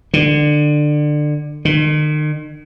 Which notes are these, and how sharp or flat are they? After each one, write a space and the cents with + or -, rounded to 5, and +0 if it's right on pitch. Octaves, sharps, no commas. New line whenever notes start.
D3 +20
D#3 -40